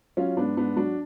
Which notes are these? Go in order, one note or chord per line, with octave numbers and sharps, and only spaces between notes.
F#3 C#4 F4
G#2 B3 D4
G#2 B3 D4
F#3 D4 F#4